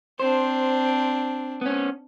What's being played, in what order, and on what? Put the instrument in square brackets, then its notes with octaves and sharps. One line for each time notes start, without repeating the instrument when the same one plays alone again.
[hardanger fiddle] C4 D4 [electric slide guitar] C5
[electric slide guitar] B3 C#4